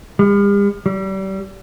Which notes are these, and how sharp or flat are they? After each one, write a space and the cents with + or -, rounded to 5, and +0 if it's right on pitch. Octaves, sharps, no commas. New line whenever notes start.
G3 +45
G3 -30